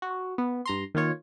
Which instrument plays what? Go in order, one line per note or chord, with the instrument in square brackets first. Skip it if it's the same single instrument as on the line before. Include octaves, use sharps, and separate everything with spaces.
[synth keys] F#4
B3
G2 A#5 C6
D#3 A#3 F4 C#5